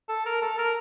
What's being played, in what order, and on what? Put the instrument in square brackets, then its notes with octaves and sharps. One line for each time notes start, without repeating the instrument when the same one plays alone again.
[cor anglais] A4
A#4
A4
A#4